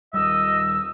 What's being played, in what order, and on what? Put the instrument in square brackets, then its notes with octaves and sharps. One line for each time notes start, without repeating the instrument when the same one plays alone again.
[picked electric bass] D#2 G3 [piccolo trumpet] D#5 [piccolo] E6